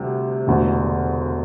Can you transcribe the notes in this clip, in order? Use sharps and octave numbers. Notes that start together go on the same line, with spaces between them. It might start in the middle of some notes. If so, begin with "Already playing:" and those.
Already playing: D2 C3 G3
E1 D2 D3